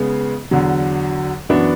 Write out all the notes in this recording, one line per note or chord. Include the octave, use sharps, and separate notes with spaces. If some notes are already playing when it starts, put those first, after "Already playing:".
Already playing: C#3 G#3 B3
E2 D3 F#3
F#2 E3 B3 D4 F#4